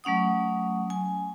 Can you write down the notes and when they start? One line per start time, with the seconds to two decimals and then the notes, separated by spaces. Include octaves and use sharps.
0.04 F#3 A3 C#4 F#5 D#6
0.90 G#5